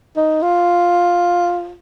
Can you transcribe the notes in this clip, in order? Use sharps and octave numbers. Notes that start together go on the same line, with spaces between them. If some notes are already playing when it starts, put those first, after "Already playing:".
D#4
F4